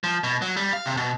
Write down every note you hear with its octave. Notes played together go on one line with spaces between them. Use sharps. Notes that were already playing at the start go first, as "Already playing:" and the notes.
F3
B2
F#3
G3
F5
C3
B2